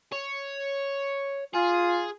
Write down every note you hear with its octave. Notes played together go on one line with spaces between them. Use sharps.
C#5
F4 G#4